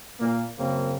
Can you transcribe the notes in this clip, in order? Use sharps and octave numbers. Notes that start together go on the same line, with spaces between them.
A#2 A#3
F#2 C#3 A#3 C4